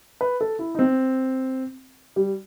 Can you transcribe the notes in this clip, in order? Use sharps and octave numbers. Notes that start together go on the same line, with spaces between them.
B4
A4
E4
D#4
C4
G3